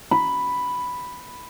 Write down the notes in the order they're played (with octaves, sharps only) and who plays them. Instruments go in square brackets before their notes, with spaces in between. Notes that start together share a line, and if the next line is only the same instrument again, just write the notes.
[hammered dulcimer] B5